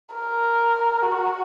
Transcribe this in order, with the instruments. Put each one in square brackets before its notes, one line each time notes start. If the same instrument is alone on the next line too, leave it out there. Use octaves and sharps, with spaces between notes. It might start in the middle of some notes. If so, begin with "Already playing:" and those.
[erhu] A#4
F#4